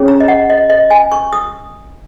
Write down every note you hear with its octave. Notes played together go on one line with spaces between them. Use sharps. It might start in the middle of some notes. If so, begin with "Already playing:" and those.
Already playing: C#4 G#4 C#5
A#5
D#5
F#5
D#5
D#5
G#5
C#6
D#6